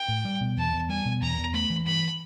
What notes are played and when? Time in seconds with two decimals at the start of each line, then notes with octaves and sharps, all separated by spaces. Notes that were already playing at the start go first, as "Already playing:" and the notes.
Already playing: G5
0.08 A2
0.25 G3
0.41 B2
0.57 E2 A5
0.73 E2
0.89 G3 G#5
1.05 B2
1.22 E2 A#5
1.38 E2
1.54 A3 B5
1.70 E3
1.86 G2 B5